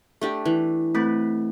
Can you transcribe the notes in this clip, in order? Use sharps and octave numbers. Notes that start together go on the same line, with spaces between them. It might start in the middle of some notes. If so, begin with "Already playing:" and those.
A3 D4 G4
E3
A3 C4 B4